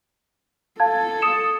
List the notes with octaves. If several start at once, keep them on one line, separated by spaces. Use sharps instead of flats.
A4 F5 A5 G#6
D#6 C#7 E7